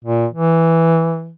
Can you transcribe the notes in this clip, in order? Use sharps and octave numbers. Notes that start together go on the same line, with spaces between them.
A#2
E3